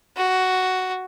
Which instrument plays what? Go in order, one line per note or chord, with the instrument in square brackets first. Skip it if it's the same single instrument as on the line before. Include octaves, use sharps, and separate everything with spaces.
[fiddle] F#4